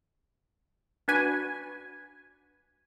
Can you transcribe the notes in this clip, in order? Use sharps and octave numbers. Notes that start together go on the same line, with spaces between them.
D4 F#4 B4 G#5